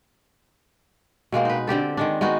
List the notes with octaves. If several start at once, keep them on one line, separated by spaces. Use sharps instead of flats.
B2 G#3 A#3 C4
D#4 B4
D3 C4 G4 A4
D#3 G#3 D4
G#3 B3 D#4 F#4